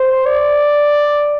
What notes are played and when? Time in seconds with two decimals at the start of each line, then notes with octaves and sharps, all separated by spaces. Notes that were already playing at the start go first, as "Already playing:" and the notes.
Already playing: C5
0.26 D5